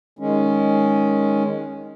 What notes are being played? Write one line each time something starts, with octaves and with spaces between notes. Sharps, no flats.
D#3 G#3 C#4